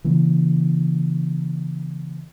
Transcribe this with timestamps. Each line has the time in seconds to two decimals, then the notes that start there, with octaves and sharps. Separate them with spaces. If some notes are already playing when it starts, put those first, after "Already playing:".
0.04 C#3 E3 A#3